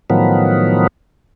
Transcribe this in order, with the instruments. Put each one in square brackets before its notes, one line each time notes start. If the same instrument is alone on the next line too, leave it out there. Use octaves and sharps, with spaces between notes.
[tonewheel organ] A2 D#3 F3 F#3 B3